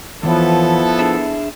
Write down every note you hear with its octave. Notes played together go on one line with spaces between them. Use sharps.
E2 E3 F3 B3 E4 A4 C#5
D4 G#4 E5